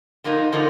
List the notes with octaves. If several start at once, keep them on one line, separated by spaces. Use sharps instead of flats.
D3 F3 A#3 D#4
D3 F3 A#3 D#4